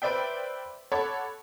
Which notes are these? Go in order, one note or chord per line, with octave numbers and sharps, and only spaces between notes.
B4 C5 D5 E5 G5
A4 C#5 F#5 B5 D6